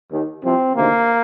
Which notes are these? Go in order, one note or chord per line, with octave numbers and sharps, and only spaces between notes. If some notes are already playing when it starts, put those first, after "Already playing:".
D#2 D#3
C2 C3 F3 C4
D2 C3 D#3 A#3